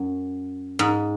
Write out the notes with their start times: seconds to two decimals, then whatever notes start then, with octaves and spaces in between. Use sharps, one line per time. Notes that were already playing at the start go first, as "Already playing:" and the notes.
Already playing: F#2
0.79 G#2